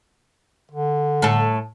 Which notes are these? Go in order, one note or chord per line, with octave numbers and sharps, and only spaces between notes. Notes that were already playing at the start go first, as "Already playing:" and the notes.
D3
A2 A4